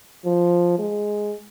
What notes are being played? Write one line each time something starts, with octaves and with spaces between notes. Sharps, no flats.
F3
G#3